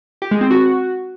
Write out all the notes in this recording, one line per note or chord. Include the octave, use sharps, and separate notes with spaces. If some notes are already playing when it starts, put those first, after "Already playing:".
G4
G#3
C4
F#4